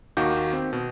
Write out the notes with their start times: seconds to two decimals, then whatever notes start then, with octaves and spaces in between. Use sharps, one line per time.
0.17 D#2 D#3 F#4 F5 D6 G6
0.53 C4
0.73 B2